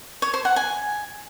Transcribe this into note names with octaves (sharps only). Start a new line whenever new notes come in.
C#5
C5
F#5
G#5